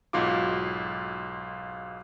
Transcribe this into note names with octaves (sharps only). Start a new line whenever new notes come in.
B1 G#2 F4 F#4 D6